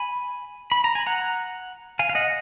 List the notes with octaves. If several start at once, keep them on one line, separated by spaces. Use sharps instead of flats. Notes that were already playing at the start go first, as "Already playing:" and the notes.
Already playing: G#5 B5
B5
A#5
G#5
F#5 A#5
F5 G#5
F5
D#5 F#5